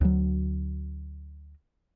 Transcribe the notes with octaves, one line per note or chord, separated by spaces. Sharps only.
D2 F#3